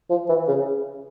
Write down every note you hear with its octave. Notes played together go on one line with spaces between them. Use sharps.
F3
E3
C#3